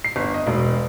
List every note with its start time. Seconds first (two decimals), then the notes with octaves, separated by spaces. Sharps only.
0.04 C7
0.16 G1
0.34 D#5
0.47 E1